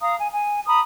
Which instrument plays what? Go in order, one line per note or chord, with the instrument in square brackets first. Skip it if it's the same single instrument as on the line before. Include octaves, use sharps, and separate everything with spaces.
[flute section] F5 A#5 D#6
G#5
G#5
A#5 B5 D#6